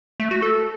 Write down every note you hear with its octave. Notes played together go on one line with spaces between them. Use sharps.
A3
F#4
A4